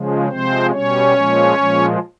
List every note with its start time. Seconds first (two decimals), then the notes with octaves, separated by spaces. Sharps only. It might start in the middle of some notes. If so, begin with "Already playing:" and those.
Already playing: C#3 F3 G#3
0.28 C3 F3 G#3 C4 C5
0.71 B2 G3 C#4 C#5
1.14 A#2 F3 G#3
1.56 A#2 F3 G#3